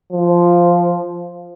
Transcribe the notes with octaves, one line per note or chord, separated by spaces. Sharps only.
F3